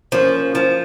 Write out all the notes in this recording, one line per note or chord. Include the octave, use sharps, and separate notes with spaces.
F3 A#3 C#4
F3